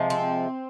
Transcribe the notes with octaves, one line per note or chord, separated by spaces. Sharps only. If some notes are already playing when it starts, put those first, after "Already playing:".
Already playing: C3 F3 G#3
C4